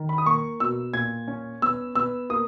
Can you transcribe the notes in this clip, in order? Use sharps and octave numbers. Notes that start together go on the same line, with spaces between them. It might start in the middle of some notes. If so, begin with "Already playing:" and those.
Already playing: D#3
B5
D#6
A#3 C#6
B2 E6
A#2 G#6
C#4
B3 E6
B3 E6
A#3 D#6